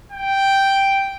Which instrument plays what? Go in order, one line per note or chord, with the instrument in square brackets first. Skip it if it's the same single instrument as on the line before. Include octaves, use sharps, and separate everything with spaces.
[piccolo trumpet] G5